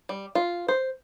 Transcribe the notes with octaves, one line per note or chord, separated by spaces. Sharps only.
G3
F4
C5